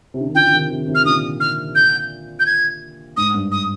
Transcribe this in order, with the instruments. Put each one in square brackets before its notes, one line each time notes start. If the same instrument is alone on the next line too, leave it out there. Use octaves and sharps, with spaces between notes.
[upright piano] C3
D3
D#3
[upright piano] D3 F3 [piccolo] G5
[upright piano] D3
C3 D#3
C3 D#3
C3 D#3
[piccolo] F6
[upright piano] A#2 D3 [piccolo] D#6
[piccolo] F6
G6
G6
G#6
[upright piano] G#2 [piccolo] D#6
[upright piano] G2
[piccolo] D#6